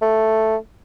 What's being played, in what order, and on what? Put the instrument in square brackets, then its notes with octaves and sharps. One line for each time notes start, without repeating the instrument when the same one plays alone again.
[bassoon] A3